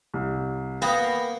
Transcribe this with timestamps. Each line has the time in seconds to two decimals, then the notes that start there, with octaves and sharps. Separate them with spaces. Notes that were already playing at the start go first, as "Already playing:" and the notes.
0.14 C2
0.82 A#3 B3 G5 D#6